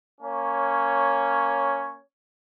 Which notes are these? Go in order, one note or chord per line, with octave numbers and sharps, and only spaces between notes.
A#3 C#4 C#5